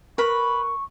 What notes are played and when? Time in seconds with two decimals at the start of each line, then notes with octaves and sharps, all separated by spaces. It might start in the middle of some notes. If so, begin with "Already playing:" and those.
0.18 A#4 B4 B5 C#6